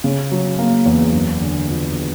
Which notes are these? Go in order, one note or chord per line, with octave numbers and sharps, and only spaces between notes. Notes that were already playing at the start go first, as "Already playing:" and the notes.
C#3
F#3
A#3
E2
F#2
D3
F3